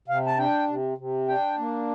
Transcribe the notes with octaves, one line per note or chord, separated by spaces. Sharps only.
C3 F5
A5
D4 G5
C3
C3
D4 G5
A#3